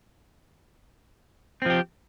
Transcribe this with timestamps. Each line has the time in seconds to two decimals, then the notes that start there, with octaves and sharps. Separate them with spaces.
1.62 C4
1.66 F3
1.70 G4